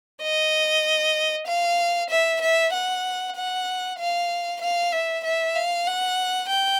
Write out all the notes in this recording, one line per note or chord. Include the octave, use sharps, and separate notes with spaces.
D#5
F5
E5
E5
F#5
F#5
F5
F5
E5
E5
F5
F#5
G5